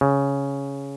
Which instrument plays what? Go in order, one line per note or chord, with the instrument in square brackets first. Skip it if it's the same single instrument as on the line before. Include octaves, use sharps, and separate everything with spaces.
[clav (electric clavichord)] C#3